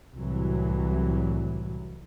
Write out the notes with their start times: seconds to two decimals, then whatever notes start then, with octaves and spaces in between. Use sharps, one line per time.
0.17 C2 A2 E3 F#3